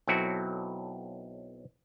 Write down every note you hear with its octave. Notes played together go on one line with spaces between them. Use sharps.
B1 F#3 C4 E4 F#4 A4